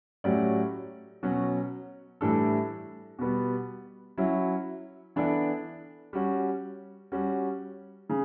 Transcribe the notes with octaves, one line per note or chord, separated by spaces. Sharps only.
A2 F#3 C#4 G4 D5
B2 F#3 C#4 F#4
A2 E3 G3 D4 A4
B2 G3 B3
F#3 C#4 E4
E3 B3 D4 A4 D5
G3 C#4 F#4
G3 C#4 F#4
C#3